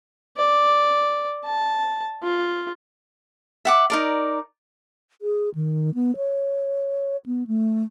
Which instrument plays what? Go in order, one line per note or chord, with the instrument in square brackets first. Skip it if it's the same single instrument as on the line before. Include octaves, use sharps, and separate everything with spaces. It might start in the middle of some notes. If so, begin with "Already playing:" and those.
[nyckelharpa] D5
A5
F4
[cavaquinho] E5 F#5 D6
D#4 A#4 D5
[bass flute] G#4
D#3
B3
C#5
B3
A3